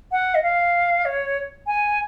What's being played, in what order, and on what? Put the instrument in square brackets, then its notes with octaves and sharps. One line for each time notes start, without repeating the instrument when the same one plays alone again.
[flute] F#5
D#5
F5
C#5
G#5